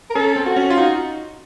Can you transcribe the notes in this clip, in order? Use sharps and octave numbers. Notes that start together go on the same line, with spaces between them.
A#4
C#4 A4
C4
F#4
C#4
F4
D#4 F#4